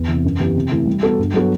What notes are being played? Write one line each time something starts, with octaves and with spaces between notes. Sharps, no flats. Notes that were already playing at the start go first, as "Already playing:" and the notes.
Already playing: E2
C3 E3
F#2
E3 B3 E4 G4
C3
E3 A3 E4
G3
B3 F#4 A4
G2
F#3 B3 F#4 A4